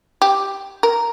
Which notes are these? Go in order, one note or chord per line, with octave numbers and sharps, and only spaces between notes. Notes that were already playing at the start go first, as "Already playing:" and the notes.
G4
A#4